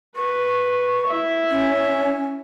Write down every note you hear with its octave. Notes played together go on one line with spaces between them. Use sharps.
B4 C#6
E4 E5
C#4